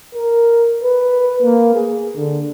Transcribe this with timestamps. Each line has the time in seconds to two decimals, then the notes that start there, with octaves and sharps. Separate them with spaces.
0.14 A#4
0.83 B4
1.42 A#3
1.74 G#4
2.16 D3